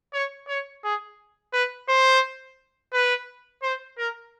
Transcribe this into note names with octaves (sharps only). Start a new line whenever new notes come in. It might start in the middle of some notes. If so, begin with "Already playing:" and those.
C#5
C#5
G#4
B4
C5
B4
C5
A#4